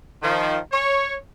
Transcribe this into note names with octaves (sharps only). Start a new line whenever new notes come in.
D#3 F3
C#5